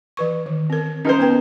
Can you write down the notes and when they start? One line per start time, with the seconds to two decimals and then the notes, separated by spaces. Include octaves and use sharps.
0.17 E3 B4 C#6
0.46 D#3
0.70 C4 A#4
1.05 C#4 D#4 A#4 C5
1.19 B3 B4 G5